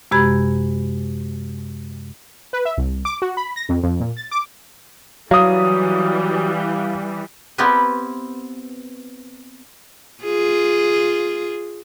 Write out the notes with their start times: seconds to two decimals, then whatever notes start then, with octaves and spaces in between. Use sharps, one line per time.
0.11 F#2 C3 G#3 G4 B5 G#6
2.53 B4
2.65 E5
2.77 C2
3.05 D6
3.22 F#4
3.37 B5
3.56 A#6
3.69 F2
3.83 F2
4.00 A#2
4.17 A6
4.31 D6
5.31 E3 F#3 G3 F5 D#6
7.58 B3 C4 E4 G4 A#4 B4
10.23 F4 G#4